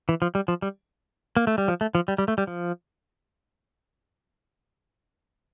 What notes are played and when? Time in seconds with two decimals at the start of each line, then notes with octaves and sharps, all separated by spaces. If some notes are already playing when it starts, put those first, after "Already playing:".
0.09 E3
0.22 F3
0.35 G3
0.48 F3
0.62 G3
1.37 A#3
1.47 A3
1.58 G3
1.68 F3
1.81 A3
1.95 F3
2.08 G3
2.18 G3
2.28 A3
2.38 G3
2.47 F3